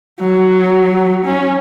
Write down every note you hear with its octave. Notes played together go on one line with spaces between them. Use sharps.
F#3
C#4